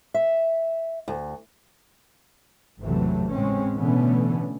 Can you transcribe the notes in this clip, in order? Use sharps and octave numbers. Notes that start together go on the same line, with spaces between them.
E5
D2
G#1 E2 C3 E3 F#3 A3
A2 C#3 G#3 C4 C#4
B2 D3 E3 A3 B3 C#4